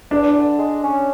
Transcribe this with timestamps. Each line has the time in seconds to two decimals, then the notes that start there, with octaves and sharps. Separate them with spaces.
0.11 E2 D4
0.36 D3
0.59 G#3
0.84 C#4